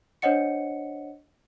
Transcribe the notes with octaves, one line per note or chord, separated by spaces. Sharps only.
D4 C5 C#5 D#5 F#5 C#7